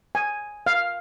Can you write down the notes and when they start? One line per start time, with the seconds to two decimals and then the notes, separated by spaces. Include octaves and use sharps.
0.15 G#5
0.66 F5